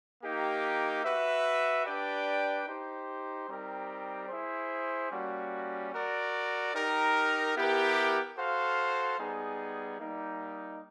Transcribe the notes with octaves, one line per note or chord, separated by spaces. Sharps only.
A#3 D#4 G4
F#4 B4 E5
D4 G4 B4 D5 G5
D#4 G4 C5
G3 C4 D#4 G4 A#4
E4 G#4 C5
G3 A#3 C#4 F#4
F#4 A#4 D5
D#4 G4 A#4
B3 E4 G4 A#4
F#4 A4 C5 F5
G3 B3 D#4 G#4
G3 A#3 D#4